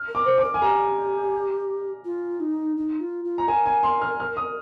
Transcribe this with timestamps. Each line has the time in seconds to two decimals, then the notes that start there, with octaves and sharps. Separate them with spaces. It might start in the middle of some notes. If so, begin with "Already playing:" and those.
Already playing: F6
0.08 A#4
0.15 D6
0.26 C5
0.38 D6
0.44 A#4
0.54 G#5
0.62 G4 A#5
2.05 F4
2.40 D#4
2.77 D#4
3.00 F4
3.25 F4
3.38 A#5
3.48 A#4 G#5
3.66 G#5
3.83 C6
4.01 F6
4.20 F6
4.37 D#6